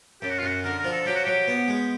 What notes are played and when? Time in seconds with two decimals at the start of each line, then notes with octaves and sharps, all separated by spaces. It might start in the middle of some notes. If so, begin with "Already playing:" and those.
0.22 F#2 G4
0.30 F#4
0.39 F4
0.43 F#2 F#4
0.64 D3 A#4
0.79 A#4
0.85 F3
0.92 A4
1.06 F#3 G4
1.16 F#4
1.24 F#3 G4
1.48 B3
1.68 G#3